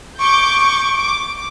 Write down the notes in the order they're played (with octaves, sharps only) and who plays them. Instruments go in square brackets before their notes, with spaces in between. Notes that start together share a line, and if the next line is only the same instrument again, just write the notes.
[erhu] C#6 [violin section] D6 G6
[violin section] D6